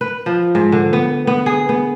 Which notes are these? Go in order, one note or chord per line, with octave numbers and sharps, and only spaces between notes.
B4
F3
G#2
D3
B3
B3
G#4
B3